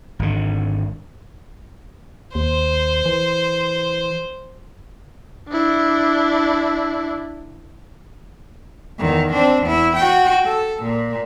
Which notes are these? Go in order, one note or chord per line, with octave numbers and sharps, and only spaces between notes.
G#1 D3
D#2 C5
E3
D4 E4
E2 D#3
C4 D4
E2 E4
F#4 G5
A4
A#2